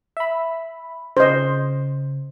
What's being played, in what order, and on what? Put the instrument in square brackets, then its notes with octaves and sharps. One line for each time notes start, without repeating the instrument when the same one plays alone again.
[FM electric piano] E5 B5
[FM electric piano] C#3 [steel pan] C5 D#5